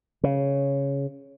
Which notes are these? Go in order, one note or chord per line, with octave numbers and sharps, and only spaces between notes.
C#3